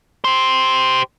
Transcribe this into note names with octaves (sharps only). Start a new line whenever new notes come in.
G4 C5